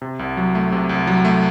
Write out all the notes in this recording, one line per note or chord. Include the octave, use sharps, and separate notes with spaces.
C3
C2
F#3
A3
C3
C2
F#3
A3